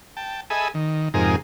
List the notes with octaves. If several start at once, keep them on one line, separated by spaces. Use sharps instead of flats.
G5 A5
G#4 A4 D#5 E5 G#5 B5
D#3
F2 G#2 C3 D#4 G#4 A#4